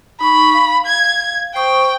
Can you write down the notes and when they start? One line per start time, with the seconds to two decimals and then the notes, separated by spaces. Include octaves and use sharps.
0.21 D#4 B5 C#6
0.54 F5
0.86 G#6
1.55 C5 G5 C#6 D#6